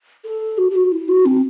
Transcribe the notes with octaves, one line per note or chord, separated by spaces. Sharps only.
A4
F#4
G4
F#4
E4
F#4
C4